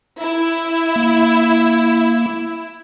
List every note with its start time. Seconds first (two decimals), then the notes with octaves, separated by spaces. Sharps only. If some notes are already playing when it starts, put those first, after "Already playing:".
0.19 E4
0.96 A#3